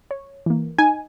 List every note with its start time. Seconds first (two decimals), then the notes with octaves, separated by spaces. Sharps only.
0.11 C#5
0.46 E3 A#3
0.78 D#4 G#5